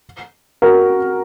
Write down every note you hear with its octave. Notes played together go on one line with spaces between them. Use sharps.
F#4 A#4